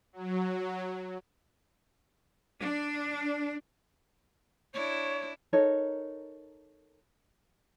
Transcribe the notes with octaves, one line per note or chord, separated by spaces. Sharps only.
F#3
D4
D4 E4 C#5
D#4 A4 A#4 C#5